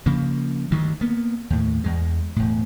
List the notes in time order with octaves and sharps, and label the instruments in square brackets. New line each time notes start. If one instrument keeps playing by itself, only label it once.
[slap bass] C#3 F3 A#3
D2 G2 D#3
A#3 B3
D#2 A2
E2 G#3
E1 A2